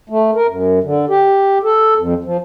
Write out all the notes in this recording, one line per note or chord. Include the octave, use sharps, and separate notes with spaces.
A3
A#4
F#2
D3
G4
A4
F2
F3